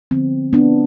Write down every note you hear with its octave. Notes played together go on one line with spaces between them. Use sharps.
D3 F3 B3 C4
B3 D4